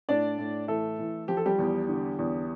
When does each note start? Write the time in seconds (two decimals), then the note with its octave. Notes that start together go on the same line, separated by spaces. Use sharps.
0.09 A2 D4 D5
0.38 A2
0.68 E3 A3 A4
0.99 E3
1.28 F3 G4
1.37 A4
1.46 G3 G4
1.58 E2
1.89 D3
2.19 E2